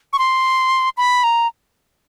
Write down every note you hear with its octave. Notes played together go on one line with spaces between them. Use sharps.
C#6
C6
B5
A#5